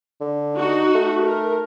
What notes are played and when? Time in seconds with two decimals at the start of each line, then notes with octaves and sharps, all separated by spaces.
0.21 D3
0.55 D#4 F#4
0.95 A3
1.25 A#4